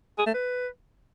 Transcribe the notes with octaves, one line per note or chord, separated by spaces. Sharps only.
G#4
A3
B4